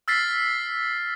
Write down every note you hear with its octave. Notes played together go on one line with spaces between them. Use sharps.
E6 F6 A6 B6 C7